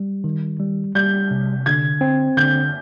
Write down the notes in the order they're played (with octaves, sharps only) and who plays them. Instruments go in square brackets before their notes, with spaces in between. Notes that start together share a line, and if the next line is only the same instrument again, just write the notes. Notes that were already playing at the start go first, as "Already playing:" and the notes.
Already playing: [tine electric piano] G3
D#3
G3
[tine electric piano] G3 [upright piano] G6
[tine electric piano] C3
[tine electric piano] D3 [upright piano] G#6
[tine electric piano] C4
[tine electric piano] D3 [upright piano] G6